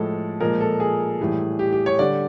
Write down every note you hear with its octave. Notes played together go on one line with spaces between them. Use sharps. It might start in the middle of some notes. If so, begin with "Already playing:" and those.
Already playing: A2 F3 G#3 A4
A#2 F3 G#3 A#4
A4
G#4
A2 E3 G3
G4
G4
C#5
D3 G3 D5